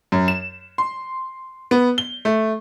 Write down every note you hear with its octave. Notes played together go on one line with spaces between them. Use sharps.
F#2
E7
C6
B3
G7
A3